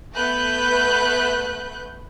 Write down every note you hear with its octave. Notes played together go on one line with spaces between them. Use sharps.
A3 B3 B4 F#6 G6